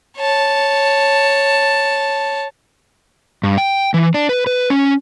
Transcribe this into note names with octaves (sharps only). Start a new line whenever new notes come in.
C#5 A5
G2
G5
E3
D4
B4
B4
C#4